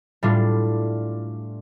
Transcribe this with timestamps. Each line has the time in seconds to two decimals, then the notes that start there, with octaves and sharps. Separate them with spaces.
0.23 A2 G3 D4 F4